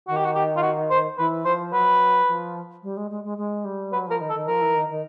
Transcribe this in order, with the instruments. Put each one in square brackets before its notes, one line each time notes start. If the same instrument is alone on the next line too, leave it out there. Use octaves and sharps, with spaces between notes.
[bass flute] D#3 [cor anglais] F#4
[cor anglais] G4
F#4
G4
F4
F#4
C5
[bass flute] E3 [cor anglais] B4
[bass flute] F3 [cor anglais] C5
[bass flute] F#3 [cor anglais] B4
[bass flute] F3
G3
G#3
G#3
G#3
G#3
G3
[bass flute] F#3 [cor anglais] B4
[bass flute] F3 [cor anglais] A#4
[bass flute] D#3
[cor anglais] A4
[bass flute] D#3
[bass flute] F3 [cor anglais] A#4
[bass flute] E3
D#3
D#3